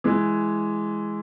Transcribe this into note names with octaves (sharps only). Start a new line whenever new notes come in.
E3 G#3